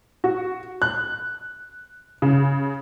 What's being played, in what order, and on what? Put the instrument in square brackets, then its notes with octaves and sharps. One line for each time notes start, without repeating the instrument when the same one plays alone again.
[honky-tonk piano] F#4
F#6
C#3